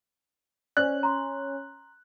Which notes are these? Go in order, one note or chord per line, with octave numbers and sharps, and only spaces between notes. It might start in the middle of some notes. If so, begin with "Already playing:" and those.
C#4 C5 D5 F#6
A#5 C6